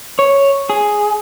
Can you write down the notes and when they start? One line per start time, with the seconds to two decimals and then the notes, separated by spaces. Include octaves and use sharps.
0.19 C#5
0.70 G#4